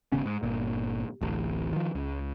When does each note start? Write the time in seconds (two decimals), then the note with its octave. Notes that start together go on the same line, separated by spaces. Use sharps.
0.12 G#1 C#3 B3 C#4
0.26 G#2
0.43 G1 A#2
1.21 D1 A1
1.73 D#3 F3
1.95 C#2